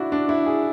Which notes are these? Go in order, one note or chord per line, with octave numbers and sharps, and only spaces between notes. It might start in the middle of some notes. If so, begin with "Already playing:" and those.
Already playing: D4 E4 F#4
D4
E4
G#4